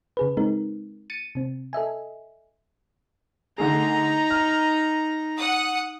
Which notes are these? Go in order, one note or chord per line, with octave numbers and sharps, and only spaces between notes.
C#3 G#4 B4
G#3 C4 D#4 A#4
A6 C#7 D#7
C3 C4
A4 D#5 E5 G#5
D3 A3 D#4 G#4 A#5
F6
F#5 D#6